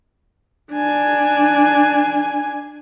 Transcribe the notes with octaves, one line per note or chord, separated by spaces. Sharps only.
D4 G#5